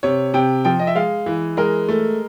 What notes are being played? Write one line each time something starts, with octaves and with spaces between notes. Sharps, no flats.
C3 C#5
C3 G5
F3 G5
D#5
E5
G#3 F5
E3
G#3 A#4
A3